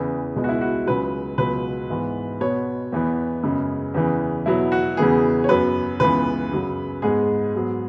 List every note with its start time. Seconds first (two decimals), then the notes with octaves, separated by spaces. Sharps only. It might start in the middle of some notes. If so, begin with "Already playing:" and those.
Already playing: E2 C#3 E3
0.36 C#2 B2 G#3 B3
0.44 F#4
0.49 E4
0.61 F#4
0.86 C#2 C#3 F#3 B4
1.38 C#2 B2 F#3 B4
1.90 G#2 E3 B3
2.40 B2 B3 C#5
2.92 E2 E3 B3
3.43 F#2 C#3 G#3 B3
3.94 E2 C#3 E3
4.46 E2 B2 F#3 B3 E4
4.72 F#4
4.97 E2 C#3 E3 B3 G#4
5.44 C#5
5.49 F#2 F#3 B3 B4
6.00 C#2 C#3 E3 B3 B4
6.51 F#2 C#3 F#3
7.02 G#2 G#3 B3 G#4
7.54 G#2 F#3 B3